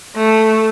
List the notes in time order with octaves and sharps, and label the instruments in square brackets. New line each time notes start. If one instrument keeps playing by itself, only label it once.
[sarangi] A3